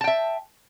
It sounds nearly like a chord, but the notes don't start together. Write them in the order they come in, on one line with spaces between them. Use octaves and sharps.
A5 G5 E5